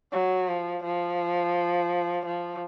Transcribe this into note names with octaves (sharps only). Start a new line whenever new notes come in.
F#3
F3
F3
F3